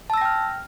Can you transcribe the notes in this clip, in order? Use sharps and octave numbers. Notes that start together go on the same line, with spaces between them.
G5 A5 E6 F6 A#6